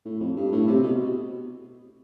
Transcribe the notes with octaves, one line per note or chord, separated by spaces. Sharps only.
A2
F2
G2
A2
C3
B2